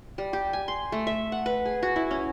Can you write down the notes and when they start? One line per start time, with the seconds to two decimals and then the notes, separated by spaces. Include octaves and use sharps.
0.18 G3
0.33 G4
0.53 G#5
0.68 C6
0.92 A3
1.07 E5
1.32 F#5
1.46 B4
1.65 G#4
1.83 F#4
1.96 E4
2.11 C#4